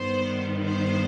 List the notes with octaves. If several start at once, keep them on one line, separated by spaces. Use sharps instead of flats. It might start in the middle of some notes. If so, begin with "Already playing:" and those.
Already playing: G2 D#3 B3 C5
C5